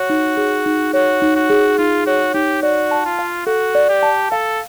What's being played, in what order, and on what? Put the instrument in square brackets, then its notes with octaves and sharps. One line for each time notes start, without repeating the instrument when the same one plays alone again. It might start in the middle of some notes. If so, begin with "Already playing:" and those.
Already playing: [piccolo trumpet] F#4 [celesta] C#5
[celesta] D#4
G#4
D#4
[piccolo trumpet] F#4 [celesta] C#5
[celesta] D#4
[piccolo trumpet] F#4
[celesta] G#4
[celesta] D#4 [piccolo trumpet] F4
[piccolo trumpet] F#4 [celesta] C#5
[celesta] D#4 [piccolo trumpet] G4
[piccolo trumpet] F#4 [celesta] D5
[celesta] A5
[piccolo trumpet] F4
[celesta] F5
[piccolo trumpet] F#4 [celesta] A4
[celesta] D5
[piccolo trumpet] G4
[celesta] A5
[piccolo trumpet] A4 [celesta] F5